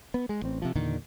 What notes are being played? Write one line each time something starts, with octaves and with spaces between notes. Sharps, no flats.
B3
G#3
A1 C4
C3 F3
E2 A#2 D3 D#3